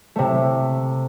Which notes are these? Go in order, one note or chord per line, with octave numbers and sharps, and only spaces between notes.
C3 A3